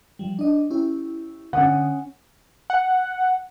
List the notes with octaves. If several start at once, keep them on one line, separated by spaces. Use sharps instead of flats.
F3 G3
D4 D#5
C#4 E4 G4
D3 C#4 F#5 D#6
F#5